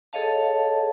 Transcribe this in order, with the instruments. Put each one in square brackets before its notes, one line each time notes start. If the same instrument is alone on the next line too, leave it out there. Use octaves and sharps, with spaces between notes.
[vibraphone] G#4 A4 C#5 D#5 F5 A5